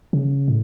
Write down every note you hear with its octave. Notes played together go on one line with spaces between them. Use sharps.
C#3
A2